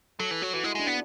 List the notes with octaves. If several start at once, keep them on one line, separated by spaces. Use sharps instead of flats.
F#3 A4
E3
F#3 F#4
E3 F#4
G#3 E4
G#3 D4
B3 D4